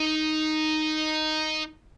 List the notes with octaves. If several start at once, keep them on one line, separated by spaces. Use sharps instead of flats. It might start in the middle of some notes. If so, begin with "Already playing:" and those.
Already playing: D#4